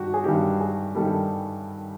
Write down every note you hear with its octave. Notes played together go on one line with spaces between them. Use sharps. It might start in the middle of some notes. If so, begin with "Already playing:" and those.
Already playing: G2 D#3 F#4 G4
G#4
G2 D#3 G3 G4
G#4
G2 D#3 G3 A4